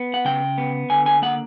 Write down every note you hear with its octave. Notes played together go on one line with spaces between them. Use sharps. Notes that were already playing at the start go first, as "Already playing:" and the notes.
Already playing: B3
F#5
C#3 G5
B3
D3 G#5
G#5
A#3 F#5